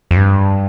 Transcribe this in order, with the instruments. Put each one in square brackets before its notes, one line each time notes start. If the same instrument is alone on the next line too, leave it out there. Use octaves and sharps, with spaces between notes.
[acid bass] F2
G2